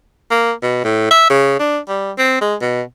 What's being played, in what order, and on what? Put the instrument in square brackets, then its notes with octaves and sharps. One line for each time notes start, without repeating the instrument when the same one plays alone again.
[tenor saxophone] A#3
B2
A2
E5
C#3
D4
G3
C4
G#3
B2